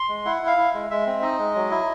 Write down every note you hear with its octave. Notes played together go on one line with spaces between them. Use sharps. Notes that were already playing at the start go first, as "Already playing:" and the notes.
Already playing: C6
G#3
E4 F#5
E4 F5
E4
G#3
G#3 E5
C4
D#4 D#5
G#3
F#3
E4